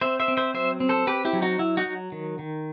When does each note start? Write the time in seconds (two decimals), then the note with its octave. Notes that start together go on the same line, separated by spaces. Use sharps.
0.01 C4 C5 E5
0.20 C5 E5
0.28 C4
0.37 C5 E5
0.54 F#3 C5 E5
0.80 C4
0.89 A4 C5
1.07 C4 G4 B4
1.25 E4 G4
1.33 F#3
1.42 D#4 F#4
1.59 F#3 E4
1.77 D#4 F#4
1.86 F#3
2.12 D#3
2.39 D#3